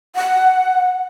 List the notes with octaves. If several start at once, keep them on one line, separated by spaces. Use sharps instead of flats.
F#5